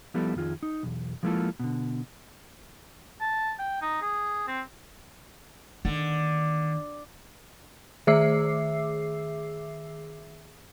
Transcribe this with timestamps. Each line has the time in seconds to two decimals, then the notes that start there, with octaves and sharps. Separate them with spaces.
0.14 F3 G3 B3 E4 A4
0.35 F2 D#3 F4 G#4
0.63 D#4
0.83 B1 E2
1.23 F3 G#3 A#3 E4 F4 A4
1.59 B2 D3
3.21 A5
3.59 G5
3.82 D#4
4.02 G#4
4.48 C4
5.85 D3 D#3 A#3
8.07 D#3 G#4 E5 D6 E6 C7